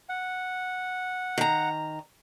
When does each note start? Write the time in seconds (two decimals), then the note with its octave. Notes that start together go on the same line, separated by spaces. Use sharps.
0.09 F#5
1.38 D#3 A#5